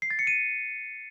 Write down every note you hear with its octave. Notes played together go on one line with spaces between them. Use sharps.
C7
A6
C#7
D#7